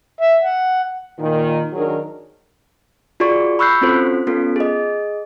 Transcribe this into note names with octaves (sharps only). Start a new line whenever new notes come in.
E5
F#5
A#2 D#3
D#3 F#3 D4 G#4 A#4
F4 F#4 G#4 D5 C#6
B5 C#6 E6 F#6 G6 C7
C4 C#4 F4 F#4 A4 C5
B3 C#4 F4 A4
G#4 D#5